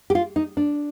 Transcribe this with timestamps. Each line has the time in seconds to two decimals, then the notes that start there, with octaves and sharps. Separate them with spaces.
0.10 G4
0.15 F4
0.36 D#4
0.57 D4